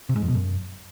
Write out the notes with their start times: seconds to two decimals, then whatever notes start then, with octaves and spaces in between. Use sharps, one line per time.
0.09 C3
0.16 G#2
0.22 F2
0.28 B2
0.35 F#2